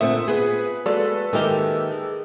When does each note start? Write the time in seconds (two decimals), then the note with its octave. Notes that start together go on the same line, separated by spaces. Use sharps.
0.01 A#2 D3 A3 C4 E5 F#5 D#6
0.28 B3 F4 G#4 B4
0.86 G#3 A#3 F#4 A4 B4 D5
1.33 D#3 G#3 A#3 G4 A#4 E5 D6 E6
1.92 G#4